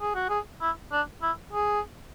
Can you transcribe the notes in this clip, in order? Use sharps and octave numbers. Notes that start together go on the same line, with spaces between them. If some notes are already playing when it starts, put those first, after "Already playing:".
G#4
F#4
G#4
E4
D4
E4
G#4